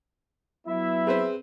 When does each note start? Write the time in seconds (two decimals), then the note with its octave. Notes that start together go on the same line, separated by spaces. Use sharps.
0.68 F#3 B3 E4 E5
1.07 C4 G#4 B4 C5